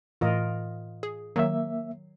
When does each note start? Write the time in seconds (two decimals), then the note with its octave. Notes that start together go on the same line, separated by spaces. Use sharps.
0.21 A2 E3 F4 A#4 D#5
1.03 G#4
1.36 D#3 F#3 A#3 E5